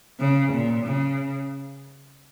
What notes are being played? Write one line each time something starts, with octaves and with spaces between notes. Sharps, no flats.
C#3
A#2
C#3